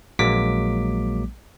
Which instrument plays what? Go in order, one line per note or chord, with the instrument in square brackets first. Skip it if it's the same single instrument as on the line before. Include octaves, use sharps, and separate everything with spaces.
[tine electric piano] A#1 F#3 G#3 A#3 D6 B6